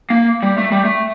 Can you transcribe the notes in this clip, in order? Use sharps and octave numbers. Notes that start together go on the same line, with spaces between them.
A#3
G3
A3
G3
A3